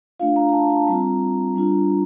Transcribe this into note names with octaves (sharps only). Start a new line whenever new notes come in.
A3 D4 F4 F5
A#5
A#5
A5
A5
G3 C4 F4 A#5
G3 D4 F4